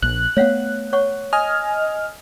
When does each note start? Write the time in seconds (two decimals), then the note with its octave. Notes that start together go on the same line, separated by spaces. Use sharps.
0.02 A#1 F#6
0.37 A3 B3 C#5 F5 F#5
0.93 C#5 F#5 C#6
1.33 D#5 G#5 F6